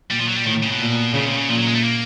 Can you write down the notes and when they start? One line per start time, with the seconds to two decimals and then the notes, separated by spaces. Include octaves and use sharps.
0.10 A#2 G3
0.19 F3
0.28 F#3
0.36 G3
0.45 A2 D#3
0.63 C#3
0.72 B2
0.80 A#2
1.14 A2 C#3
1.26 C3
1.37 C#3
1.48 A#2 F3
1.58 F#3
1.66 G#3
1.75 A3
1.84 A#3